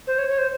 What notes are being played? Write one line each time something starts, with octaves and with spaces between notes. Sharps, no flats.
C5
C#5
C#5
C5